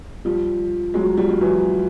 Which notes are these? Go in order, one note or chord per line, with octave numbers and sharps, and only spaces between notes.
F3 G3
F#3 G#3
F3 G3
G3
E3 F#3